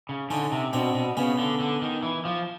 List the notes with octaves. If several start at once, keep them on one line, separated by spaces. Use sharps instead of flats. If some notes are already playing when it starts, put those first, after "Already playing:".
C#3
D3 C#4 D#4
C3
B2 C4 D4
B2
C#3 B3 C#4
D3
D3
D#3
E3
F3